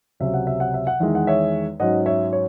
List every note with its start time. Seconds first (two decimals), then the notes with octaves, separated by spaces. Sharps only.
0.20 C#2 C3 F#3 C#4 E5
0.34 F#5
0.47 E5
0.60 F#5
0.74 E5
0.87 F#5
1.00 E2 D#3 G#3 E5
1.15 F#5
1.27 C#5 E5
1.80 G#2 F#3 C#4 D#5 F#5
2.06 C#5 E5
2.33 C#5